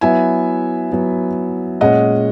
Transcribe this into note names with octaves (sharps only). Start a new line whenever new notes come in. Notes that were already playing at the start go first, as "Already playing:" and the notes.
F#3 B3 E4 E5 G#5
F#3 B3 E4
A#2 G#3 C#4 D#5 F#5